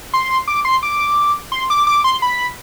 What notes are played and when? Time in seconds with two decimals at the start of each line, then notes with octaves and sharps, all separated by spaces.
0.14 C6
0.48 D6
0.65 C6
0.83 D6
1.52 C6
1.70 D6
1.87 D6
2.04 C6
2.22 B5